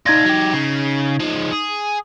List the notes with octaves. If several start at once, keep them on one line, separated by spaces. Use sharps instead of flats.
D4 D#4 F4 G#6 A#6
F#3 G4
C#3
F3 G#3
G#4